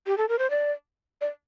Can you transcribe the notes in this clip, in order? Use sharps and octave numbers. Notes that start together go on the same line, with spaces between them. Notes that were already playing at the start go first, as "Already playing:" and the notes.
G4
A4
A#4
C5
D5
D5